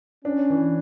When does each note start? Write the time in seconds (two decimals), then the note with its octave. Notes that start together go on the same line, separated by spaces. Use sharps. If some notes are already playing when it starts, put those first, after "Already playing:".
0.25 C#4 D4
0.50 E3